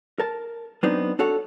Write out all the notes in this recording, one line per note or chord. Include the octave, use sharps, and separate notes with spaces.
A#4 A5
F#3 B3 C4 D4 D#4
D4 F#4 A4 C#5 F#5